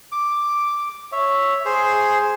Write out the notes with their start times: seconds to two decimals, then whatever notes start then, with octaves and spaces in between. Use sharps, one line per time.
0.12 D6
1.12 C#5 E5
1.65 G#4 C5